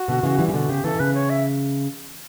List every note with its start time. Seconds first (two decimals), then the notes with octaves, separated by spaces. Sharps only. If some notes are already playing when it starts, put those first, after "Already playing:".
Already playing: F#4
0.08 B2 D3
0.23 C#3 E3
0.39 E3 G3
0.48 C#3
0.53 B2 D3 F#4
0.69 C#3 G4
0.84 C#3 E3 A4
0.95 B2
0.99 C#3 B4
1.14 C#5
1.30 E5